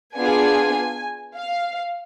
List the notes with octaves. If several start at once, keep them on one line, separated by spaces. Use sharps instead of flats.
B3 D4 F4 G#4 G#5
F5